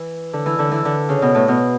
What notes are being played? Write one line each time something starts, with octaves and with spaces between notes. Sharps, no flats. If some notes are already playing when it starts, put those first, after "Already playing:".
Already playing: E3
D3
E3
D3
E3
D3
C#3
B2
A2
B2